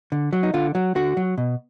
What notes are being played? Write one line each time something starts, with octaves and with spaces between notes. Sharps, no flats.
D3
F#3
D#4
D3 F4
F#3
D3 F#4
F#3
B2